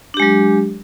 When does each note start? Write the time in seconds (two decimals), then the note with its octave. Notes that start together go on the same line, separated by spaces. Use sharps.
0.14 D4
0.17 G4
0.20 G#3
0.22 F#3